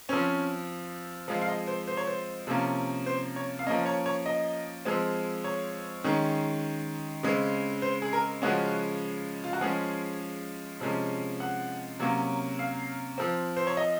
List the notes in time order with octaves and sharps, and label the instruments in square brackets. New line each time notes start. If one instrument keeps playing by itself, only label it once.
[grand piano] F3 C4 C#4
F3 G#3 C4 F4
F5
D#5
C5
C5
C#5
C5
C3 F3 A#3 C#4
C5
C#5
F5
F3 A#3 C#4 D#5
C#5
C#5
D#5
F3 G#3 C4
C#5
D#3 G#3 C#4
C#3 G#3 C4
C5
G#4
A#4
C#3 F3 G#3 C#4 F#4
F4
F#4
F3 G#3 C#4 G#4
C3 F3 G#3 C#4
F#5
C3 F#3 A#3 C#4
F5
F3 C4
C5
C#5
D#5